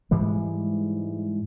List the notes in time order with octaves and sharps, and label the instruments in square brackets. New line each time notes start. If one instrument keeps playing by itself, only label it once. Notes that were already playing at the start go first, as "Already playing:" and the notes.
[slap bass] G#2 E3 G3 G#3